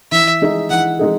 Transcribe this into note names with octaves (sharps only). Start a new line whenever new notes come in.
E3 E5
G#3 D#4 G#4
E3 F#5
G#3 D#4 G#4